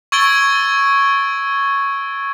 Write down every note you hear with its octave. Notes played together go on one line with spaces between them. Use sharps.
C#6 E6 G#6 A6 D7 G7